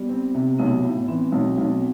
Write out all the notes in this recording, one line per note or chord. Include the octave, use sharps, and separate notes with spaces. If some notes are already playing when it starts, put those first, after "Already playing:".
Already playing: G3 B3
C4
C3
B1 B3
A2
E3 C4
B1
B1